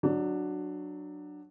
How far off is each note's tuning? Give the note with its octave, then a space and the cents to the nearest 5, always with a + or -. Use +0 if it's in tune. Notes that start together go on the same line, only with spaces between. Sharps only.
F#3 +0 D4 +15